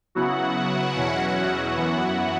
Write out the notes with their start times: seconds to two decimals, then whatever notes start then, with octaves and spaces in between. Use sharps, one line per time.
0.15 C#3 F#3 B3 E4 F#4 F#5
0.96 E2 B2 F#3 C#4 E4
1.77 F#2 E3 B3 E4